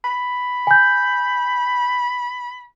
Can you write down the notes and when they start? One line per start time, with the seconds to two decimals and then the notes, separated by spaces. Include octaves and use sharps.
0.04 B5
0.67 G#5 G6